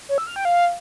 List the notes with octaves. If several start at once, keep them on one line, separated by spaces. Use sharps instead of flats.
C#5
E6
F6
G5
F5